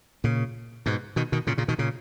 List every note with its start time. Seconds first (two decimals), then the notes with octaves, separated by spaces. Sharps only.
0.24 A#2 C#3
0.86 G#2 B2
1.16 B2 D#3
1.32 B2 D#3
1.47 A#2 C#3
1.58 A#2 C#3
1.68 B2 D#3
1.78 A#2 C#3